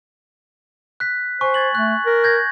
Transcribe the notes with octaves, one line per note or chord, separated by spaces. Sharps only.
F#6 B6
C5 G#5 C#6
G#6 A6 F#7
A3 F#6
A#4
G6 G#6 A#6